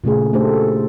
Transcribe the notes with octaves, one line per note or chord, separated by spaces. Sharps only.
A#2 C#3 A3 G#4
A3 D4 G4 A4 C5